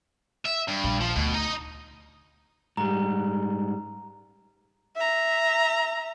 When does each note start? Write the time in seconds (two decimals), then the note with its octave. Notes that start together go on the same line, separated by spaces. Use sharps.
0.46 E5
0.68 G2
0.84 A#1
1.00 F3
1.16 D2 B2
1.34 D#4 D#5
2.77 G#2 G3 A#5
4.96 E5 A#5